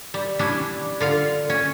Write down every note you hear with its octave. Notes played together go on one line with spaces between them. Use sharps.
G3
G3 C#4 D4 E4
D3 F4 F5
C#4